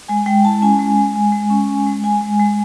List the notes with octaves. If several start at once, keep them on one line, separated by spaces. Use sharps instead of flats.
G#3 G#5
G#3 G5
E4 A5
C#4 G#5
G#3
G#3
G#3
G#3
C#4
G#3
G#3
G#3 G#5
G#3
G#3